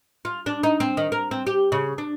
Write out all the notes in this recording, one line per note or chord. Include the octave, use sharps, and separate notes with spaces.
F4
D4
D#4
C4
D#3
A#4
C4
G4
C#3
D4